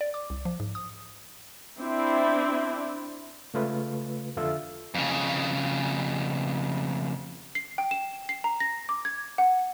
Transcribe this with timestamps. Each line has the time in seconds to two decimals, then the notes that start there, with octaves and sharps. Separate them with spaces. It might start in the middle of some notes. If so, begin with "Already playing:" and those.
0.01 D5
0.14 D6
0.30 C2
0.45 F3
0.60 G#2
0.75 D#6
1.80 C4 D4 E4
3.54 C#3 G#3 A3 F4 B4
4.37 F2 D3 F4 A4 E5 E6
4.95 F2 C#3
7.55 C7
7.78 G5
7.91 E7
8.29 C7
8.44 A#5
8.60 A#6
8.89 D6
9.05 G#6
9.38 F#5